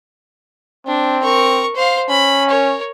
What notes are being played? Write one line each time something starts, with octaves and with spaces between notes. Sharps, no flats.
C4 D4
A#4 C#6
C5 F5
C#4 B5
A#4 C#5